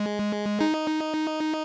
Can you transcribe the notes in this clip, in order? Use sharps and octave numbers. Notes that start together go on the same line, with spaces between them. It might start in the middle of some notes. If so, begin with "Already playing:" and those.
Already playing: G#3
D#4